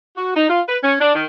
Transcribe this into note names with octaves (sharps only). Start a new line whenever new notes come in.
F#4
D#4
F4
B4
C#4
D4
D#3